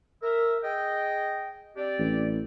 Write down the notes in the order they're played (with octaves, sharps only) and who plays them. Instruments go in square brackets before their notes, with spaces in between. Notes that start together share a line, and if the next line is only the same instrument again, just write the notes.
[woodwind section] A#4 E5
G#4 D#5 G5
C4 G4 D5
[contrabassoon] A1